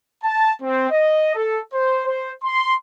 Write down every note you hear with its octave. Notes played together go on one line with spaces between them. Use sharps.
A5
C4
D#5
A4
C5
C5
C6